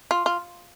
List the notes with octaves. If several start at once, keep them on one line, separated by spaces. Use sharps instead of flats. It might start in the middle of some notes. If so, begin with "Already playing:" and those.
F4
F4